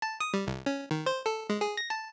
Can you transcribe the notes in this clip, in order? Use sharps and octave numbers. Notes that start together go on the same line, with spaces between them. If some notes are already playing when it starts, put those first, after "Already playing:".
A5
D#6
G3
C2
C#4
D#3
C5
A4
G#3
G#4
A#6
A5